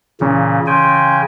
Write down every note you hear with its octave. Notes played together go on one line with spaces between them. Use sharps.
C#2 A#2 C#3 E3 C#4
C#3 G5 G#5 C6